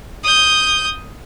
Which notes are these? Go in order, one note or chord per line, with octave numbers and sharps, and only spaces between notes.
D#6 G6